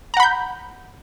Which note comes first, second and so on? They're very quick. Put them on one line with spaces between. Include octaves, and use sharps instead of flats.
A#5 F#5 B5 G6